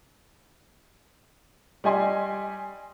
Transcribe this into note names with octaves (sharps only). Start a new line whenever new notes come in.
G3 G4 D#5 G#5 C6